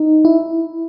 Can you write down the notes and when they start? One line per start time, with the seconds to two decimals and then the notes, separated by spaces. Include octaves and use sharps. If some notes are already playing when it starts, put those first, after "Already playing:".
Already playing: D#4
0.25 E4